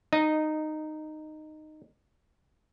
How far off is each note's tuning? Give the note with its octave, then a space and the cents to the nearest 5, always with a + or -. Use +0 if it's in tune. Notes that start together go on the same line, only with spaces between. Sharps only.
D#4 -15 D#5 +0